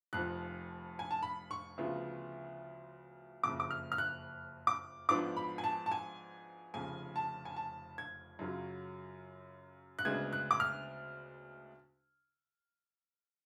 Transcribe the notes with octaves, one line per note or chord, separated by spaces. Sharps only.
F1 F2 F3 F#6
G#5
A5
B5
C#6
D2 C#3 F3 B3 F4
F#1 F2 C#3 D6
D6
F6
F6
F#6
D6
G#1 G#2 F3 B3 D4 D6
B5
G#5
A5
A5
G#5
F1 F2 C#3 G#5
A5
G#5
A5
G#6
F#2 C#3 F#3 C#4 F4
F#6
D2 C#3 G#3 B3 D4 G#6
F#6
D6
F6